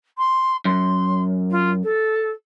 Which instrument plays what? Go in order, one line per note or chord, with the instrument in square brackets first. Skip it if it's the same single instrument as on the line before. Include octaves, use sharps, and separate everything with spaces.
[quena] C6
[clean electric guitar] F#2 [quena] C6
[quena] F4
A4